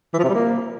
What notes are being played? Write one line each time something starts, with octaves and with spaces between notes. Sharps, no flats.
E3
F3
C3
G3
A#3